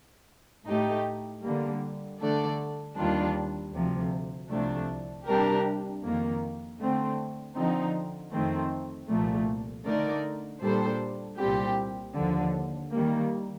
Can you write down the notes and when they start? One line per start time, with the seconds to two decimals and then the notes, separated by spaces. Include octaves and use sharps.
0.68 A2 A3 D#4 G4
1.45 D3 G3 A#3
2.21 D3 A3 D4 A4 D5
2.97 D#2 D#3 G3 D4 F4
3.74 D2 C3 F3
4.51 C2 C3 F3 A3 D4
5.27 C3 G3 D4 G4 A#4
6.04 F2 D#3 A#3
6.80 D3 A3 C4
7.56 D3 F3 C4 D#4
8.33 F2 D#3 A3 C4
9.10 C2 A#2 F3 A3
9.87 D3 A3 D#4 A#4 D5
10.62 A#2 G3 D4 A4 C5
11.39 C2 A#2 G3 C4 G4
12.16 D#2 D3 F3
12.93 D#3 G3 A#3